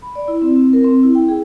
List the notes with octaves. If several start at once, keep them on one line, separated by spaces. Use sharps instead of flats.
B5
D5
E4
C4
C4
A#4
C4
E4
G5
G#4